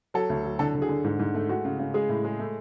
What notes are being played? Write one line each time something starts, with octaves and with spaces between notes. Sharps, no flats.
F#3 A4
D2
F#3
D3 A4
D3
G#4
D3
G#2
G#2
A3
G#3 F#4
C#3
C#3
G#3 G#4
A2
G#3
A3